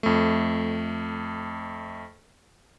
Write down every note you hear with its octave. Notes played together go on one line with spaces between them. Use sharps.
F2 A3